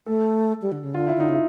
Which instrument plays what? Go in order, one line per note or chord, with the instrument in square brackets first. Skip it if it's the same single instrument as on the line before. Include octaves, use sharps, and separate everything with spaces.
[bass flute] A3 [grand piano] A4
[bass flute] G3
D3
C#3
[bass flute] D3 [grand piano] F4
[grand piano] E4
[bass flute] D3 [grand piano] D#4
[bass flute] C#3 [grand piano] E4